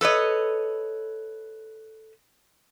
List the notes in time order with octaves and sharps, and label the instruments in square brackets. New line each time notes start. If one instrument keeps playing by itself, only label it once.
[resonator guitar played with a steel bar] A4 B4 C#5 D#5